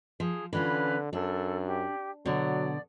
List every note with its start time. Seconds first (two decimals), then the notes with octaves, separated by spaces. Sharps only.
0.20 F3 G#4
0.53 D3 E3 C#4 F4 B4
1.13 F#2 D4 A4
1.67 G4
2.26 B2 D3 F#3 D5